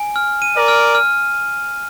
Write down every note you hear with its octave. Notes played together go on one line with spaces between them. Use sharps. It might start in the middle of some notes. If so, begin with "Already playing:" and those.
Already playing: G#5
F6
D#7
A#4 D5
F6
F6